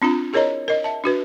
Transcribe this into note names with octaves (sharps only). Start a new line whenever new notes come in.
C4 D4 F4 A#5
E4 G#4 A#4 C#5 D#5 A#5
A#4 D#5
E5 A5
D4 F#4 B4